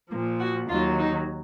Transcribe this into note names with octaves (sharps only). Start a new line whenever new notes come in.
A#2 F3 A#3
F#4
D#2 D#3 F#3 F4
D#4